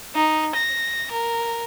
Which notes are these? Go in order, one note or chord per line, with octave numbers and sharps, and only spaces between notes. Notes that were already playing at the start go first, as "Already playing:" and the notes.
D#4
A#6
A#4